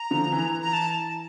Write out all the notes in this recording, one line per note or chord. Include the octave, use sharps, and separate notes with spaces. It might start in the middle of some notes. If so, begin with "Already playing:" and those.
Already playing: A#5
D3 F3
E3
A#5
A5